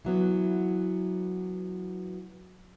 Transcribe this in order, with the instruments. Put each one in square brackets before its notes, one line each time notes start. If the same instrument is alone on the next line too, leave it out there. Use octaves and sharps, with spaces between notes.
[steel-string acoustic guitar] E3 F#3 B3